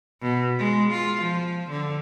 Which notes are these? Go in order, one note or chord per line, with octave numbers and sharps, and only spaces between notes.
B2
G#3
F4
F3
D3